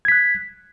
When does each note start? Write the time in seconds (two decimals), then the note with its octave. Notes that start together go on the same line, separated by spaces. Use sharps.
0.05 G#6
0.08 B6
0.12 F#6